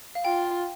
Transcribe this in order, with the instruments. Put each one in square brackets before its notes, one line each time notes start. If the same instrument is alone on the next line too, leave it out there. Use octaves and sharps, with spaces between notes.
[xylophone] F5
[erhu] F4 [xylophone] G5